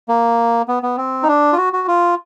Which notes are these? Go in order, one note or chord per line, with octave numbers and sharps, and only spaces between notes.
A#3
B3
B3
C4
D#4
D4
F4
F#4
F#4
F4